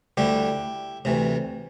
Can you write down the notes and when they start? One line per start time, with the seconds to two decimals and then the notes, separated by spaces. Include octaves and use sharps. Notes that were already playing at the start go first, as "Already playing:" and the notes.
0.17 D2 D3 G3 E4 G4
1.05 D2 C3 E3